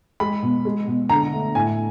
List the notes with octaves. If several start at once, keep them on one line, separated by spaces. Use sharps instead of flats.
G#3 B5
B2
G#3
B2
D3 A#5
A3
A2 G#5